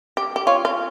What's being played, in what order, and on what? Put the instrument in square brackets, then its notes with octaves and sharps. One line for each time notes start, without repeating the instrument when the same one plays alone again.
[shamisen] G4
G4
[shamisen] F4 [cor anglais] C#5
[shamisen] F4